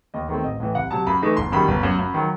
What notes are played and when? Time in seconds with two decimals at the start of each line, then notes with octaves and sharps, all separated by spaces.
0.14 D#2 D#5
0.29 D#3 A3 C4
0.44 A1 D#5
0.60 A2 E3
0.75 C2 F#5
0.91 C3 F#3 A5
1.07 F#2 B5
1.22 E3 A3 D#4
1.37 G1 C6
1.52 F#2 D#3 G3 B5
1.68 G1
1.83 F#2 F#3
1.98 F#2
2.14 D#3 F#3